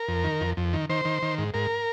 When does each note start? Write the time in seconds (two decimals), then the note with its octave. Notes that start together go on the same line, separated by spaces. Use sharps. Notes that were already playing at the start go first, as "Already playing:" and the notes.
Already playing: A#4
0.08 F2
0.24 D#3
0.41 F2
0.57 F2
0.73 D#3
0.90 D#3 C5
1.05 D#3
1.23 D#3
1.38 G#2
1.54 G#2 A#4